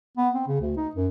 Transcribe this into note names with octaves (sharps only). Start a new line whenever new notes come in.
B3
C4
C#3
D2
D#4
F#2